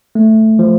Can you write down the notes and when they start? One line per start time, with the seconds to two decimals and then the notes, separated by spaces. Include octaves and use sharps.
0.15 A3
0.59 F3